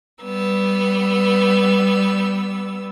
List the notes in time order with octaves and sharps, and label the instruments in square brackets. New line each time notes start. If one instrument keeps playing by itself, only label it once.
[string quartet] G3 B3 E6